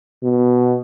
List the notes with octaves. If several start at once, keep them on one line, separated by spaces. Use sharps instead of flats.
B2